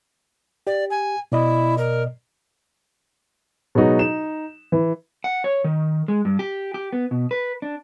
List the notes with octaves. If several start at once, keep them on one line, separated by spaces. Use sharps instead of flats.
G4 D5
G#5
B2 E4 D5 D#5
A#4
B2 F#3 G#3 D#4 F#4
D#4 E7
E3
F#5
C#5
D#3
G#3
G2
G4
G4
B3
B2
B4
D4